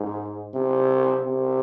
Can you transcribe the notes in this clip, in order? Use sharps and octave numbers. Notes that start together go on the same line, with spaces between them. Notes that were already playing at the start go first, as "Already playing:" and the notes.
Already playing: G#2
C3
C3